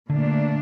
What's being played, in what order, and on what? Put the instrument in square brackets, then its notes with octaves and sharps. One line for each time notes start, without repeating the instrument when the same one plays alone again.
[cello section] A#2 A3 D4 [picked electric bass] D3